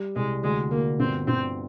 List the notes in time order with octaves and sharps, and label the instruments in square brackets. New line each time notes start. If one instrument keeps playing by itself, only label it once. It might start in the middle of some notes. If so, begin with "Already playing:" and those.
Already playing: [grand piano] G3
[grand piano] C2 [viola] G#3
[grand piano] D2 [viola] G#3
[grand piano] D2 [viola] A#3
[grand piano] G1 [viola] C4
[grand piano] G1 [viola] C4